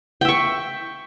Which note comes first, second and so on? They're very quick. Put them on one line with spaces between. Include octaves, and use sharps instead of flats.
G5 E5 C#6